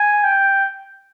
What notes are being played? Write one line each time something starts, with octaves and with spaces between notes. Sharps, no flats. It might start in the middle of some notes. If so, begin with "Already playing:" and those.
Already playing: G#5
G5